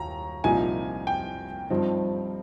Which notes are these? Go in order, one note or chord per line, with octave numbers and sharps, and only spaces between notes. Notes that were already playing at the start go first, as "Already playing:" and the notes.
Already playing: D#2 A#5
C2 A#2 F3 A#3 D#4 G#5
G5
G2 F3 C4 D#4